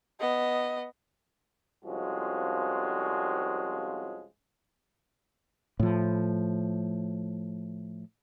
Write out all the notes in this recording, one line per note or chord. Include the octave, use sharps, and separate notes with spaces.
B3 D#5
C2 F2 F3 G#3 C#4 F#4
A2 F3